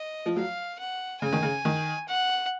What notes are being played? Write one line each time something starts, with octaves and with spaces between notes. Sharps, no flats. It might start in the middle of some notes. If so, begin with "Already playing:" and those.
Already playing: D#5
F3
F#3 F5
F#5
C#3 G#5
D#3
C#3
D#3
F#5